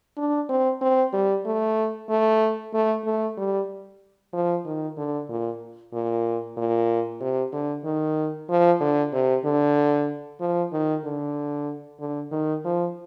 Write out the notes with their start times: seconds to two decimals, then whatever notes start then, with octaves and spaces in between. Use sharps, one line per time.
0.18 D4
0.49 C4
0.81 C4
1.13 G3
1.45 A3
2.09 A3
2.74 A3
3.05 A3
3.37 G3
4.33 F3
4.65 D#3
4.97 D3
5.29 A#2
5.93 A#2
6.57 A#2
7.21 C3
7.52 D3
7.85 D#3
8.49 F3
8.80 D3
9.13 C3
9.44 D3
10.40 F3
10.72 D#3
11.05 D3
12.00 D3
12.32 D#3
12.64 F3